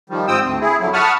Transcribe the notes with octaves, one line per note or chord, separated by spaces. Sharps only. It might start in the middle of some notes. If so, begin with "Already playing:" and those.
D#3 F3 G3
G#2 C4 G5 D#6 E6
D2 C4
E4 G#4
F2 D3 F#3 E4
F#5 A5 B5 C#6 D#6 F6